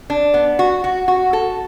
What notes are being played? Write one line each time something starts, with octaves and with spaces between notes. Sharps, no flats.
D4
B3
F#4
F#4
F#4
A4